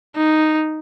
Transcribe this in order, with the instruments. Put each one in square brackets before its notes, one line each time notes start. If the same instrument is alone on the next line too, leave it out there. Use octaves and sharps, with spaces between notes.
[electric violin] D#4